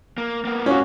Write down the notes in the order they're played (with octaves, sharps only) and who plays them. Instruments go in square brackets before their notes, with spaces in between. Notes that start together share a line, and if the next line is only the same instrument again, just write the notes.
[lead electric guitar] A#3
A#3 B3
[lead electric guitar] G#2 F5 [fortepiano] C#4 F#4